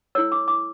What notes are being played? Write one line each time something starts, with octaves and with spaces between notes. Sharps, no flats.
E4 A4 C#5 E6
D6
D6